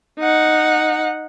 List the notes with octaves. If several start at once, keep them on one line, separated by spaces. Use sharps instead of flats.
D#4 F#5